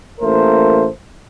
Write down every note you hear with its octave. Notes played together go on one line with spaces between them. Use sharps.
A1 A3 A#3 A#4 C5